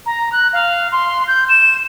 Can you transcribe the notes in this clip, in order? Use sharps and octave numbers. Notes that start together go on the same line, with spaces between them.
A#5
F#6
F5
C6
G6
E7